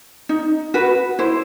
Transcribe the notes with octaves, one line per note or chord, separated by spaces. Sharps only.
D#4
F#4 B4
E4 C5